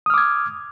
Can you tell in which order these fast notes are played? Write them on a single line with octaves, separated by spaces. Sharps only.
D#6 F6 D6 G#6